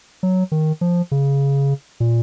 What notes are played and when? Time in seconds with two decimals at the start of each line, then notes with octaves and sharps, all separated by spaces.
0.23 F#3
0.52 D#3
0.81 F3
1.12 C#3
2.00 A#2